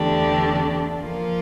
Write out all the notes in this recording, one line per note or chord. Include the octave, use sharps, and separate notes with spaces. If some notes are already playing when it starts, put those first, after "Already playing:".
Already playing: E2 D3 A3 D4 G4
F3 A#3 F4